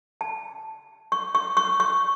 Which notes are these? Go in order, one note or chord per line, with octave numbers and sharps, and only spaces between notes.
A5
C#6
C#6
C#6
C#6